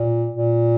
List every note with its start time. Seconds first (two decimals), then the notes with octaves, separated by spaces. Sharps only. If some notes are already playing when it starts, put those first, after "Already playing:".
Already playing: A#2
0.32 A#2